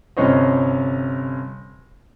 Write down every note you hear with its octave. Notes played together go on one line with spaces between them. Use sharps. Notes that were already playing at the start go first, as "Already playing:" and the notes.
G1 C3 C#4 C5 C#5 D#5